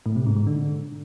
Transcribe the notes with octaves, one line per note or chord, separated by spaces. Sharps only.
A2
C3
G#2
G#2
D3